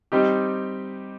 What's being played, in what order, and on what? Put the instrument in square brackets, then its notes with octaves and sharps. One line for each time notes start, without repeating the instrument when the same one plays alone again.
[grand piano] G3 C4 D#4 G4